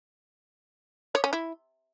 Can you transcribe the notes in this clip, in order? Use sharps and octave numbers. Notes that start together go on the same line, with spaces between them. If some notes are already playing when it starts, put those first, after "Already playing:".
C#5
C#4
E4